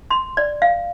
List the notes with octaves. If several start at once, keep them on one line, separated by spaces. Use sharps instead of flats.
C6
D5
F5